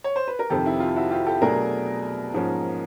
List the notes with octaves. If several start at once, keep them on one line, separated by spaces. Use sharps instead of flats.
C#5
C5
B4
A#4
F2 C3 D#3 G4 A4
E4
F4
E4 F#4
F4 G4
G4 A4
B2 F#3 A3 D4 G#4 A#4
G#2 F3 A#3 C#4